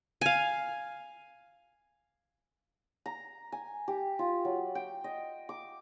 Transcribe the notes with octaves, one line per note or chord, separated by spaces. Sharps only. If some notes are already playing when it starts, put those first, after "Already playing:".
F5 G#5
A#5
G#5
G4
F4
F#3
G5
D#5
D6